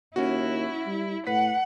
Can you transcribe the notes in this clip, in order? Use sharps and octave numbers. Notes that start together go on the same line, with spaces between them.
D#2 C#4 E4 F#4
G3
A2 B4 F#5 B6